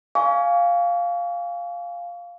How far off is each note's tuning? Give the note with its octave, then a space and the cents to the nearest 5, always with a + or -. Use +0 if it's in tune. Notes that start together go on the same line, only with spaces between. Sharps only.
F5 +0 G#5 +5 C#6 +40